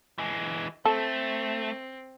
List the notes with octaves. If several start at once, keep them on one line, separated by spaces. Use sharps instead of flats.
E3 G#3
A3 C4 A4